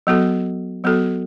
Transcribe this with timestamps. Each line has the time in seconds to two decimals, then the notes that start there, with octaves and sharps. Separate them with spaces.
0.07 F#3 B3 F#4 A4
0.84 F#3 B3 F#4 A4